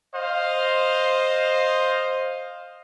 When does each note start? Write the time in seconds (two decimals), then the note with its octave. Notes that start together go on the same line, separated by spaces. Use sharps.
0.15 C5 D#5 F5